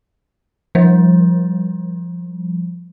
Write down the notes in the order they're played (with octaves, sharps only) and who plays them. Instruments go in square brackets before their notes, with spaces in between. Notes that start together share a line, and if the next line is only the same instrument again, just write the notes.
[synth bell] F3 G3